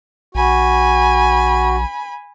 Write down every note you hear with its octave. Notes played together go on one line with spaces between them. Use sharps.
A#1 F#4 G#5 B5